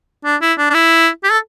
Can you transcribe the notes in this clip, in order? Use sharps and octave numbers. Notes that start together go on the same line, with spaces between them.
D4
E4
D4
D4
E4
G4
A4